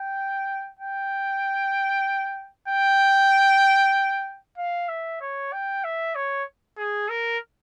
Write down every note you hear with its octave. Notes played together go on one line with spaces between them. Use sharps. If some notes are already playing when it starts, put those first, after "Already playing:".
Already playing: G5
G5
G5
F5
E5
C#5
G5
E5
C#5
G#4
A#4